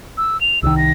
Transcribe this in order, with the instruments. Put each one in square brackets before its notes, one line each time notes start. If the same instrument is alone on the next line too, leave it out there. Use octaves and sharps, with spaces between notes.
[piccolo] E6
F7
[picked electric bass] C2 D#3 [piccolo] E6
[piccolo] A#6